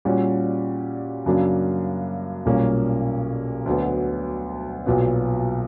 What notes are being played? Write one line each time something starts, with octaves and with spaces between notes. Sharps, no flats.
A#2 G3 C#4 F#4
F#2 C#3 F#3 A#3 D4
B1 A#2 G3 A#3 C#4
D2 D3 F#3 B3
B1 A#2 F#3 B3